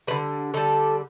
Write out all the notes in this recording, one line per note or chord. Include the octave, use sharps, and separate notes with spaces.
D3 G3 B4
D3 G3 A4